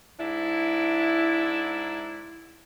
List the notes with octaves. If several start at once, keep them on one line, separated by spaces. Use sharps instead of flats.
G#2 D4 E4